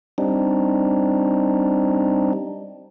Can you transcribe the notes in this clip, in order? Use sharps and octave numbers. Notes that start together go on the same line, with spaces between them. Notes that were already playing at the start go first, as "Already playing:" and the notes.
G3 C4 D4 D#4